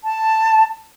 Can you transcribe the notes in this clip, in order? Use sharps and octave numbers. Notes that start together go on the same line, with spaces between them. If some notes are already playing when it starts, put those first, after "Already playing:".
A5